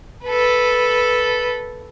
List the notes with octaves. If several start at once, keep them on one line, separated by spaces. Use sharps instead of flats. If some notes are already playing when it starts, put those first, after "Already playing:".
A4 B4